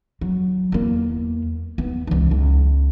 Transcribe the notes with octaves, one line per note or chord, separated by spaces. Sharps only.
F#3
E2 A#3
D#2 B3
C#2 E3
C#2